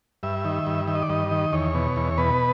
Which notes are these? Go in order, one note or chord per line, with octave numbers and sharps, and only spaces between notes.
G2 E5
D#3
G2
D#3 E5
D#5
D5
G2 D#5
D#3
E2 C#5
B2
E2
B2 B4